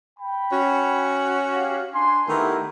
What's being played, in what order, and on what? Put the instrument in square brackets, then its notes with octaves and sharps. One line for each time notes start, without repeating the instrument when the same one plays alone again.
[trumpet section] G5 B5
[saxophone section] C#4 F#4
[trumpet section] G4 F5 F#5
D4 G#5 C6
[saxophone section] D#3 A3 B3 [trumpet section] E4 G4 A#4